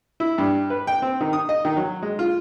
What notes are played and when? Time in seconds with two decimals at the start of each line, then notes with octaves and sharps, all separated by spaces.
0.20 E4
0.38 G2
0.70 B4
0.87 G5
1.02 C4
1.21 D#3
1.33 D#6
1.49 D#5
1.65 D#3
1.77 F#3
2.02 G#3
2.19 F4